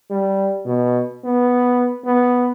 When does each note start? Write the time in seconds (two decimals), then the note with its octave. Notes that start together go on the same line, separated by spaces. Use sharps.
0.10 G3
0.65 B2
1.25 B3
2.05 B3